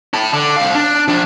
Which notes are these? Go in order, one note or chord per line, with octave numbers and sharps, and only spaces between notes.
E4 A5
D3
C2 F5
D4
F3 D4